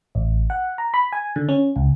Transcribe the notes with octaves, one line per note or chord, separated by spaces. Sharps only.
A1
F#5
A#5
B5
G#5
D3
C#4
C#2